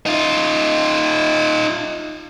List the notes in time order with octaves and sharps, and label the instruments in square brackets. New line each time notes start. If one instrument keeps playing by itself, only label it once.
[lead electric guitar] D#4 F4